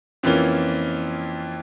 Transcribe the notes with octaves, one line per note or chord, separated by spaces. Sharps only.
F2 E3 A#3 C#4 F4